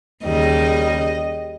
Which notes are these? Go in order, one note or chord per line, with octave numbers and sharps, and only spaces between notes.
D#2 C#3 G3 D#5